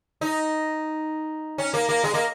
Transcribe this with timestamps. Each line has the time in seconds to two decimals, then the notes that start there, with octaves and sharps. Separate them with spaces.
0.21 D#4
1.58 C#4
1.74 A#3
1.89 A#3
2.04 G#3
2.14 A#3